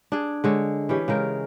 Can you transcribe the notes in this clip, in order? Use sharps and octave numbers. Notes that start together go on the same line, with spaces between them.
D4 G#4
D3 G#3 C#5
E3 C#4 G4
C#3 G#3 A#4 G5